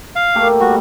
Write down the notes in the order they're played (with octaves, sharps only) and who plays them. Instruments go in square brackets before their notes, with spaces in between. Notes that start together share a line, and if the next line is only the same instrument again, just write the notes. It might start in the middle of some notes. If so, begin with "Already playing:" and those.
[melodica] F5
[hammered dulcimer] A3 A#3 G4
[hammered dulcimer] G3 [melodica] F#4